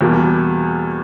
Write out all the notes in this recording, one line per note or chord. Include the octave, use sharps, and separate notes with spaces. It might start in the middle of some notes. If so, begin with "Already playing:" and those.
E2 B2 G3 A#3